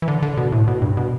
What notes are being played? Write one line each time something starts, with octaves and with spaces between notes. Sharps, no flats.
E3
D3
D3
B2
A2
B2
G2
B2